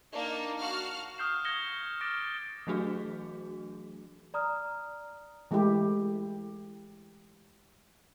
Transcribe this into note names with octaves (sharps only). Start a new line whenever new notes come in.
A#3 D4 D#4 A5
F#4 F5 A5 F6
C#6 D#6 F6 G6 C7 E7
G6 G#6 A#6 C#7 E7 G7
D6 F6 A6 A#6 D7
E3 F#3 A3 D4 F#4 G#4
D5 A#5 D#6 F6
E3 G#3 A3 E4 G4